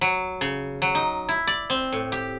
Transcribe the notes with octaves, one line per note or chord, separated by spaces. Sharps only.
F#3
C#3
F#3
D#4
E4
D5
C4
A2
G4